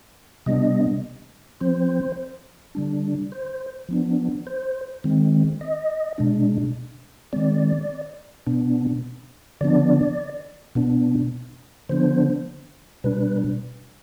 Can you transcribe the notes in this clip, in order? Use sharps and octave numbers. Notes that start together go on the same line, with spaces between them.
C3 G3 B3 D4 D#5
F3 C4 C5
D3 G3 D4
C5
F3 B3 D4
C5
D#3 G#3 C4
D#5
B2 G#3 D4
D#3 G#3 C4 D5
B2 B3 D4
D3 F3 B3 D4 D5
B2 B3 D4
D3 F3 B3 D4 C5
B2 G3 D4 B4